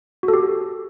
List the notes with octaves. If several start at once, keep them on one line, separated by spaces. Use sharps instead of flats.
F#4
A4
G4